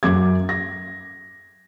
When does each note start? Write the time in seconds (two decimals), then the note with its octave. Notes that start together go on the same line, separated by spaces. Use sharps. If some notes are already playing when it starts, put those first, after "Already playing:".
0.03 F#2 D6 G#6
0.49 A#6